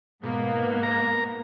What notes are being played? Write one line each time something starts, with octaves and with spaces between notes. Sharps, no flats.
G#2 B2 A#3 B3
A#4 A#5